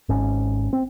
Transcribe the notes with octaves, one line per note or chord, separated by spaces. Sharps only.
G#1 G#2 C#4
C4